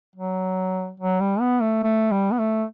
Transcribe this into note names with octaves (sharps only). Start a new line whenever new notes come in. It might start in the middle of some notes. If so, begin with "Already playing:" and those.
F#3
F#3
G3
B3
A3
A3
G3
B3
A3